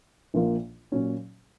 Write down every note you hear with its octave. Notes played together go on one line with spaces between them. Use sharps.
A#1 A#2 F3 A#3 F4
A#2 F#3 C#4